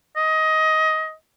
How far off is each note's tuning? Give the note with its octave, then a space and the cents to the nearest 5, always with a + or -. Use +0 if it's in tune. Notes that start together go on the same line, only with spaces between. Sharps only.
D#5 +20